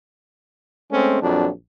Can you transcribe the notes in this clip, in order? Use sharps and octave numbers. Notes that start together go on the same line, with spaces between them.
G#3 A3 C4 C#4
A#1 F2 F#3 D4